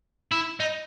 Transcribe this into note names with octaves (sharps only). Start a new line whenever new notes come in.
E4
D#4